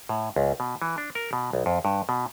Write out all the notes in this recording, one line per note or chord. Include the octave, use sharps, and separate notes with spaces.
A2
C#2
B2
E3
D4
A#4
B2
B1
F2
G2
B2